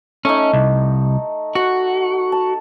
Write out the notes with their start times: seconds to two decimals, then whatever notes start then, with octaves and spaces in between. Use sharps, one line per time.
0.25 A3 C#4 D#4
0.53 C2
1.55 F#4 F#5
2.32 A5